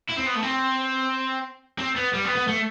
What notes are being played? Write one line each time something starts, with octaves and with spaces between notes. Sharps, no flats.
E4
C4
B3
A3
C4
C4
B3
G3
B3
B3
A3